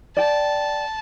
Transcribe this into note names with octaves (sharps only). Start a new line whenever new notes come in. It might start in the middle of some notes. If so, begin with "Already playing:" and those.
D5 G5 A5